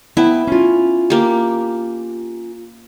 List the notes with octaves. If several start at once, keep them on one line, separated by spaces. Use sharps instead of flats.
B3 E4 G5 A5
C#4 F4
A#3 G4